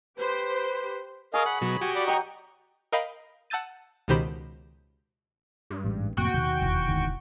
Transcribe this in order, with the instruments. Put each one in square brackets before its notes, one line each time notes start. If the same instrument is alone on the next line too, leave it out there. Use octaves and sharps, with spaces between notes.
[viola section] G4 C5 [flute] B4
[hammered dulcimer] G#4 C#5 [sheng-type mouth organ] A#4 D#5 F5
[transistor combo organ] F#5 [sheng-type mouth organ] B5
[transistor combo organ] B2 F#3
[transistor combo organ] F#4 G4 [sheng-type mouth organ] G#5
[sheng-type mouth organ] D5 B5 D6
[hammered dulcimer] F#3 G5 [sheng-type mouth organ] D#5 A#5 C#6
[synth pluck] A#4 D#5 F5 G5 B5
F#5 A5 E6 G6 A6 D#7
C#2 B2 D#3 G4 C5 B5
[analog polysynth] G2
[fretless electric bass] A1 G#2
[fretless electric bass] F2 A2 C3 [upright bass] A#3 [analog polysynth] F#4 G5 C#6
[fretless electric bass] D#2 [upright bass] B2
[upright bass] E1 E4
[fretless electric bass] G#1 D2 D#3